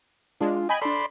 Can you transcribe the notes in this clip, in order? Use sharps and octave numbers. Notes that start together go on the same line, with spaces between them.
G#3 D4 F4
D#5 G5 G#5 B5
D4 A4 D5 B5 C6